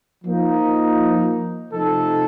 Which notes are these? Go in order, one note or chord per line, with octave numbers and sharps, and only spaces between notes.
F3 A#3 D#4
C3 F3 A3 D#4 A4